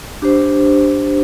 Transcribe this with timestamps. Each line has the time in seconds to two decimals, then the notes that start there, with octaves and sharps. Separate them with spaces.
0.22 D4 G4 C5